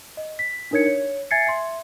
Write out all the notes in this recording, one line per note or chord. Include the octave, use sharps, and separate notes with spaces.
D#5
B6
D4 D#4 A#4 C#5 G#6 C#7
C#5
E5 G#5 G#6 A6 C7 C#7
E5 C6